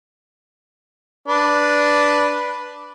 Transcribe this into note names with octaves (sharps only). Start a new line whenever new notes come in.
D4 B4